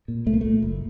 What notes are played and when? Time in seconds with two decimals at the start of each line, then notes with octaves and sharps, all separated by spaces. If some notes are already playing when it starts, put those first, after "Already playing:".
0.08 A#2
0.26 C2 A3
0.34 A#3
0.41 A#2 A3
0.62 F#1